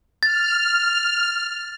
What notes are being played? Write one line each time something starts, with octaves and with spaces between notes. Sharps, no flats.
F6 A6